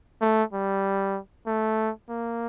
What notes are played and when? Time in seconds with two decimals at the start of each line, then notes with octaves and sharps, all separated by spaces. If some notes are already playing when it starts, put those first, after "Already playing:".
0.21 A3
0.53 G3
1.47 A3
2.10 A#3